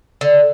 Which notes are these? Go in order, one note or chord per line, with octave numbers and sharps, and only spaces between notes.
D3